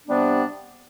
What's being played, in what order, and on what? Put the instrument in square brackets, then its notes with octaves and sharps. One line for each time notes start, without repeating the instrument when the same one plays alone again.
[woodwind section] C3 G3 B3 D4